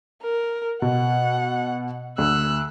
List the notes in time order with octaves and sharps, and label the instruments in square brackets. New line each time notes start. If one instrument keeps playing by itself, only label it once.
[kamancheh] A#4
[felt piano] B2 [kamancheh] F#5
[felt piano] D2 [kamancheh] E6 F#6